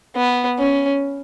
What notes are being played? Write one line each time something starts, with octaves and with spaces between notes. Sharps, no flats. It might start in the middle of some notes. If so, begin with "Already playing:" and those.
B3
C#4